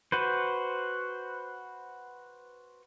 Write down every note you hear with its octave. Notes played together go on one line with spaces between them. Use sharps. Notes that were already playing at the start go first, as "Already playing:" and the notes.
F#4 B4 C5